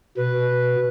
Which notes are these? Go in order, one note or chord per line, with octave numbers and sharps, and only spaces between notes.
B2 B4